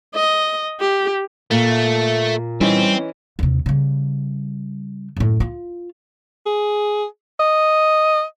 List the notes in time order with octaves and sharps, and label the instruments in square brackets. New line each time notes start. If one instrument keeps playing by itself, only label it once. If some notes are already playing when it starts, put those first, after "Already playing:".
[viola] D#5
G4
[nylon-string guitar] A#2 [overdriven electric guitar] A3
[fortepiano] E3 C#4 D#4 [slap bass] G3 [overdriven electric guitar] C4
[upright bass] D#2 C3
C#3 G3
F#2 A2
F4
[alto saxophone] G#4
D#5